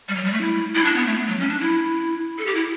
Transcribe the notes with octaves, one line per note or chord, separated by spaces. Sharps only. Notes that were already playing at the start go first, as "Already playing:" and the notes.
G3
F#3
G3
A3
E4
E4
D4
B3
A3
F#3
C#4
D4
E4
A4
G4
E4